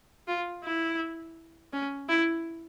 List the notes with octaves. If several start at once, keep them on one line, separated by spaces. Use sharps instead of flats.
F4
E4
C#4
E4